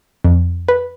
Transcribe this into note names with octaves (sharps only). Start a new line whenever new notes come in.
F2
B4